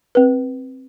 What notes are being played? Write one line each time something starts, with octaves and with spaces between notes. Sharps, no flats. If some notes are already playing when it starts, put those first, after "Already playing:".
C4 B4